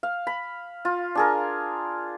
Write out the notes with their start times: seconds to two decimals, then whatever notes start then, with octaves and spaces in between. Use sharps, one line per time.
0.03 F5
0.27 B5
0.85 F4
1.15 D4 G#4 A#4